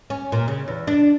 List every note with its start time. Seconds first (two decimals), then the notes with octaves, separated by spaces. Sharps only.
0.10 C#4
0.32 A#2
0.48 C#3
0.68 E2
0.87 D4